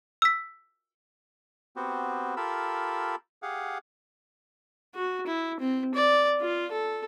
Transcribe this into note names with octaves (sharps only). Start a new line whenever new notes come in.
E6 B6
B3 C4 F#4 G4
F4 G4 A4 A#4 B5 E6
G4 G#4 F5 F#5
F#4
E4
C4
D5
F4
A4